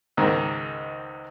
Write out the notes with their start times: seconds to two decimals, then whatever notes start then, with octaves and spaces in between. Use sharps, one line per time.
0.17 C#2 G#2 D#3